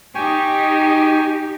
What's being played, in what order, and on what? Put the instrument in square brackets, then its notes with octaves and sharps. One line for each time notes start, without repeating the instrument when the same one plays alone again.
[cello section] D#4 G4 [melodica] G5 G#5 C#6